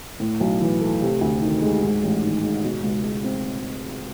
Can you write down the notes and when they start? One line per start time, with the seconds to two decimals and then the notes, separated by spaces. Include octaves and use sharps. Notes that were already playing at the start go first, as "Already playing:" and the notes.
0.20 A2
0.40 B1
0.61 E3
0.81 A3
1.01 C3
1.21 D2
1.42 D#3
1.62 G#3
1.82 G#2
2.03 A1
2.23 D#3
2.43 G#3
2.64 B2
2.83 C#2
3.04 G#3
3.24 C4